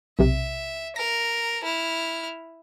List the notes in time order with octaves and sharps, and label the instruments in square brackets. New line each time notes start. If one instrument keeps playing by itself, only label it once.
[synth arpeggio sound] B1 C3 [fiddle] E5
[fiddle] A#4 [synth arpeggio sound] A#6
[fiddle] E4 F6